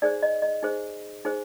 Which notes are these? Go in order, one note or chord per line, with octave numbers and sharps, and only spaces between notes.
D#4 G#4 C5 D5
D#5
D#5
D#4 G#4 C5
D#4 G#4 C5